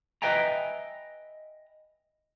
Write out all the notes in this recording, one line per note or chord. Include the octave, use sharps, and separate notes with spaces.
B4 D#5 E5 G5 G#5 A#5